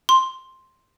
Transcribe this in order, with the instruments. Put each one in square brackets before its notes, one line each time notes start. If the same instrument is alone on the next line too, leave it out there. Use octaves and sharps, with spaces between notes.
[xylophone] C6